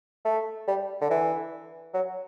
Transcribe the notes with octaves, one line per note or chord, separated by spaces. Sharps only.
A3
G3
D3
E3
F#3